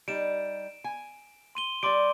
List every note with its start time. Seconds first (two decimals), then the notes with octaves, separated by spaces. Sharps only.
0.08 G3 D#4 D7 E7
0.84 G#5
1.55 C6 D#7 G7
1.83 G3 D5 C6 D6 D7